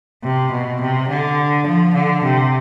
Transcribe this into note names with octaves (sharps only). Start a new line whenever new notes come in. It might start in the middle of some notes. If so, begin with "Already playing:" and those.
C3
B2
C3
D3
F3
D3
C3